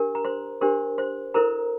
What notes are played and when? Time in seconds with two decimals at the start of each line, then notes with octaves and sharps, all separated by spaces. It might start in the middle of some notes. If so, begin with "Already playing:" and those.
Already playing: D4 G4 A#4
0.15 A#5
0.25 C5 C6
0.61 D4 G4 A#4 C5 C6
0.98 C5 C6
1.34 E4 A4 A#4 C5 A#5